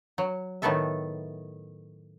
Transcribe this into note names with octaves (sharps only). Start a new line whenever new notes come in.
F#3
A2 D#3 A3 B3 A4 E5